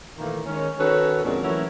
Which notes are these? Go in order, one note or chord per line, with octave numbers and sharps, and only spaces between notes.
A#2 D#3 E3 A3 A#3
D#3 G#3 C#4
D#3 C#4 F#4 A4 B4 C#5
F2 A#2 D3 G#3 C#4
E3 F#3 A3 C#4 E4 A#4